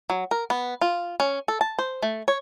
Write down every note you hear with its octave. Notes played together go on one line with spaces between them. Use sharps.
F#3
A#4
B3
F4
C#4
A4
A5
C5
A3
C#5